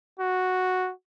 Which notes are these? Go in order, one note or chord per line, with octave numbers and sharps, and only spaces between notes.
F#4